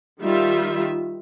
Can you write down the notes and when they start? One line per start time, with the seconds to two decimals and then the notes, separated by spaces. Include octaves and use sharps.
0.21 D#3 G3 F4 E5